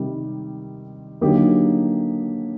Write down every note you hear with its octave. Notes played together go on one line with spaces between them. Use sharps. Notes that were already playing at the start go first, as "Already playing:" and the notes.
Already playing: C3 D#3 G3
D3 F#3 A#3 D#4 G4